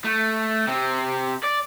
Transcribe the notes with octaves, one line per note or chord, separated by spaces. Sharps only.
A3
C3 C4
D5